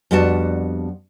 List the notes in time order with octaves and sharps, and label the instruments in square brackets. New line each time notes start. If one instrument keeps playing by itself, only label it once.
[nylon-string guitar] F2 G3 B3 D4 F#4 A5